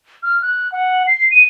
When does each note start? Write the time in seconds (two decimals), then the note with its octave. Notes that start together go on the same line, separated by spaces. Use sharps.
0.23 F6
0.42 F#6
0.72 F#5
1.07 C7
1.31 D#7